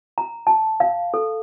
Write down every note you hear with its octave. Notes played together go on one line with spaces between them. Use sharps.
A#5
A5
F5
A4